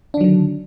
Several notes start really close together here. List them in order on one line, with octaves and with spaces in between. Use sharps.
D4 D#3 F#3 D3